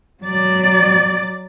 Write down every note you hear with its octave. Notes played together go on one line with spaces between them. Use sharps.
F#3 D5